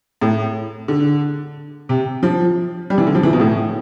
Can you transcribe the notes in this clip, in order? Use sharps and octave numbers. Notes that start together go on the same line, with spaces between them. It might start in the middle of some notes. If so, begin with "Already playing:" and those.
A2
D3
C3
F3
G3
E3
D3
F3
E3
B2
A2